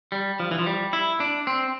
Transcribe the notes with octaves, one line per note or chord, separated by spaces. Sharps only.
G3
F3
E3
F3
G3
E4
D4
C4